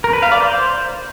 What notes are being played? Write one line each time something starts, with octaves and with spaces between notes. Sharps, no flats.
A#4
B4
F5
D5
C5